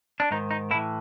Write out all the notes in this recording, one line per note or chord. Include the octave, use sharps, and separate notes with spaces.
D4
G#2 D#3 D#4
D#4
A2 E3 E4